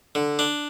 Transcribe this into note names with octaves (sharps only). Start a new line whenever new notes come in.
D3
D4